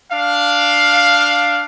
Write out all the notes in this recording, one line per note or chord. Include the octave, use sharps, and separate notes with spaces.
D4 F5